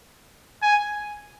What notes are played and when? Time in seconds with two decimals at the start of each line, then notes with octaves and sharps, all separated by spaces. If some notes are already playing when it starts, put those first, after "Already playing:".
0.62 G#5